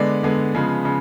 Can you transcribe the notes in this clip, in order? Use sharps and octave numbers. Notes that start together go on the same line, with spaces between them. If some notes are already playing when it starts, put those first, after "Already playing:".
Already playing: D3 G#3 B3 D5
D3 G#3 B3
C#3 F3 G#3 B3
C#3